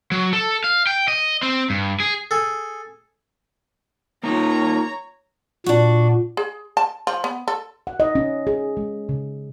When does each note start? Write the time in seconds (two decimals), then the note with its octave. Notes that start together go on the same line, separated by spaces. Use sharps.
0.12 F#3
0.33 A4
0.64 F5
0.87 G5
1.08 D#5
1.43 C4
1.70 G2
2.00 G#4
2.31 G#4 A4
4.23 A#3 D#4 F4 C#5 A#5
5.66 A#2 D4 F#4
6.37 G#4
6.77 A5
7.07 F3
7.24 B3
7.48 A4
7.87 F#5
8.00 D#5
8.15 C#4
8.47 G#4
8.77 G#3
9.09 C#3